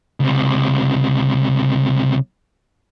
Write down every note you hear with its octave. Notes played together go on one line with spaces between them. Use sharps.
C#2 C3